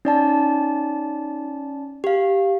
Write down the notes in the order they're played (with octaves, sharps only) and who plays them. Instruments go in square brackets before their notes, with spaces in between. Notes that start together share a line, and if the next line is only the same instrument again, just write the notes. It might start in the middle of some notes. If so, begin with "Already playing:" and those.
[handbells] C#4 D5 A5 [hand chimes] D#4
[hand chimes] G4 F5